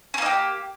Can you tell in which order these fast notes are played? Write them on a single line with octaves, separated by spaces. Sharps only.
C#4 A#3 D#4 G4